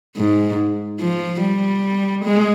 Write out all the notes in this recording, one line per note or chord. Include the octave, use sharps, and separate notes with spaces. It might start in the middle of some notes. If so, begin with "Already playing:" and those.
G#2
F3
G3
G#3